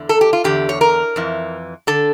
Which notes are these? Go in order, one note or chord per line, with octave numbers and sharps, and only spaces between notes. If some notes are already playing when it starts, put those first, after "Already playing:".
Already playing: E2 D3
A4
G4
F4
E2 D3 G4
C#5
A#4
F2 E3
D3 A4